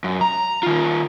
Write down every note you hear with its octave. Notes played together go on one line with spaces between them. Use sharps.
F#2
A#5
D#3 F4